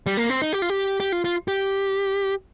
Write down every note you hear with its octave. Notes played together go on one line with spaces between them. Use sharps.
G3
A#3
C4
D#4
G4
F4
G4
G4
F4
F4
G4